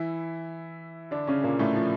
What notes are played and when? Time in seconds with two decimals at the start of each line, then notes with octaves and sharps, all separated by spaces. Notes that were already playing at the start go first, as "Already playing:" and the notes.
Already playing: E3 E4
1.11 D3 D4
1.27 C#3 C#4
1.44 A#2 A#3
1.59 A2 A3
1.75 F3